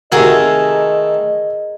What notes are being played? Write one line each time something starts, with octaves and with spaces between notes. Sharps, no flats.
C3 D#3 A3 F#4 G#4 A#4 D#5